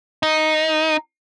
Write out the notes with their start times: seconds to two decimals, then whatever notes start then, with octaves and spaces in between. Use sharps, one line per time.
0.23 D#4